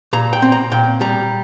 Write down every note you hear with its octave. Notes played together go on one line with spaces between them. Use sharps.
A#2 A#5
G5
C4
A#5
A#2 G5
G3 A#5